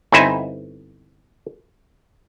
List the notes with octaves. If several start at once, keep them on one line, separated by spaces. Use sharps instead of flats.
G1 C4 D#4 E4 C5 G#5